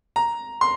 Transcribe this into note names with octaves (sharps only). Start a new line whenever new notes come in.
A#5
C6